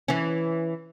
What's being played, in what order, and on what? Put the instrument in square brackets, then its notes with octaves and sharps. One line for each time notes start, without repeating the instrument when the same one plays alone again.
[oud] E3 C#4